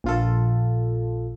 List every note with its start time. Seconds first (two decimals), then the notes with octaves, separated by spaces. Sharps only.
0.04 A#1 F4 A4